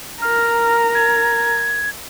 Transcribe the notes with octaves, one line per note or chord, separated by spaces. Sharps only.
A#4 A#5 F6
G#6